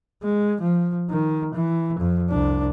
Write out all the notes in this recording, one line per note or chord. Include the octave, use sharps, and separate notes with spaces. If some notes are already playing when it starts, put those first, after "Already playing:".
G#3
F3
D#3
E3
F2
C2 D4